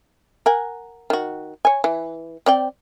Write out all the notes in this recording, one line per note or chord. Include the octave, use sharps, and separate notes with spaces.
A#4 F#5 G#5
D#3 F#4
C#5 G#5
E3
C4 D5 G5